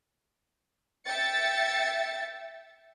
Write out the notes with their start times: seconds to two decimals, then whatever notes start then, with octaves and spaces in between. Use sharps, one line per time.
1.05 E5 G5 A6 C#7